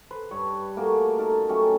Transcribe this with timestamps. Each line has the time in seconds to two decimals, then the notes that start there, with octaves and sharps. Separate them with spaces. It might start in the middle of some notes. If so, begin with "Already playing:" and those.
0.11 B4 C5
0.31 G2 C#5
0.76 A3 A#3 F#4 G#4
1.18 D#4 A4 A#4
1.49 F#3 A3 C#4 G4